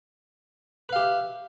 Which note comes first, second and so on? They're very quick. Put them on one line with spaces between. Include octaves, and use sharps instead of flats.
B4 F5 G4 E5